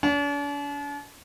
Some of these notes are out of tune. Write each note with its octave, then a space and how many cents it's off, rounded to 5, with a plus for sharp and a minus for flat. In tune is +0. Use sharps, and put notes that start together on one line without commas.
D4 -45